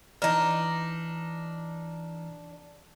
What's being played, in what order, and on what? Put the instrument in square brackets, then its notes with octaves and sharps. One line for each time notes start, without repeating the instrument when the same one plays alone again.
[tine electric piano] E3 A#5 F6 [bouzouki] D4 D#4